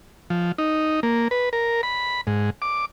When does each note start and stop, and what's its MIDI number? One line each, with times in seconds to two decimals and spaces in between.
0.30 0.52 53
0.58 1.00 63
1.03 1.28 58
1.31 1.49 71
1.53 1.81 70
1.83 2.21 83
2.27 2.50 44
2.62 2.85 86